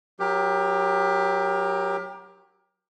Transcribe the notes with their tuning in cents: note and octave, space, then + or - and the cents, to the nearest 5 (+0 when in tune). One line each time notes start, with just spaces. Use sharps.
F#3 -5 G4 +20 A#4 +25